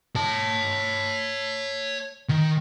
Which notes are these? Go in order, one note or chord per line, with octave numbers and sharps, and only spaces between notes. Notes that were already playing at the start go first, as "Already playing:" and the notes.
C#5 A5
D#3